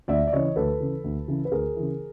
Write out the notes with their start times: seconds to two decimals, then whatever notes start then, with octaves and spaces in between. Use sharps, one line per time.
0.08 D2 D5 E5
0.27 D5
0.33 C#3 E3 C#5 D#5
0.56 D2 A4 B4
0.80 C#3 E3
1.04 D2
1.28 C#3 E3
1.45 B4
1.52 D2 G#4 A#4
1.76 C#3 E3